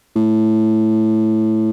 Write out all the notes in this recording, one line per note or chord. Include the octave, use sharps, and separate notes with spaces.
A2